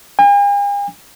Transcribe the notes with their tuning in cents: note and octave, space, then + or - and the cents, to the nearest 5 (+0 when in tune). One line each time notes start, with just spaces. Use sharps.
G#5 -45